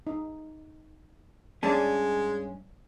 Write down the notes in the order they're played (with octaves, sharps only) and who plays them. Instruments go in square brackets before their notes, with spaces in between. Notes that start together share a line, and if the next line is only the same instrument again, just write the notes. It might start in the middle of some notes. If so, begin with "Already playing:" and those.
[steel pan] D#4
[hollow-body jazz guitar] G2 C#4 [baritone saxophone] G#3 [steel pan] D5 G#5 A5